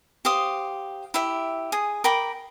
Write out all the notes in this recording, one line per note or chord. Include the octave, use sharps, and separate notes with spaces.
G4 C5 F5 D#6
E4 G4 E5
G#4 D#6
A#4 G5 B5 D6